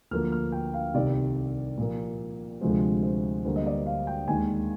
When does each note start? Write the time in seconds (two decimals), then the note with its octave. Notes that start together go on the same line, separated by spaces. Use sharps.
0.11 D2 D3 F3 A#3 F6
0.32 F6
0.52 G5
0.74 F5
0.95 C2 C3 D#3 D5
1.78 A#2 F3 A#3
2.61 D2 C3 F3 G#3 C5
3.03 C5
3.45 D2 D3 G3 A#3 C5
3.56 D#5
3.66 D5
3.86 F5
4.07 G5
4.28 D#2 D#3 G#3 G#5